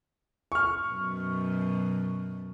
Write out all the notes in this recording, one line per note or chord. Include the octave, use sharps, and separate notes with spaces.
C#6 F6
F#2 B2